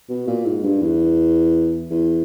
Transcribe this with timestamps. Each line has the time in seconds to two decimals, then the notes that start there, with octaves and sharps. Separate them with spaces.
0.09 B2
0.27 A#2
0.46 G#2
0.64 G2
0.81 E2
1.90 E2